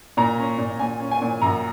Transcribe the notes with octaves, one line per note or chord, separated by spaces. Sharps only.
A#2 A#5
C#4
A#2
A#2 G#5
C#4
G#5
A#2
F#2 A#5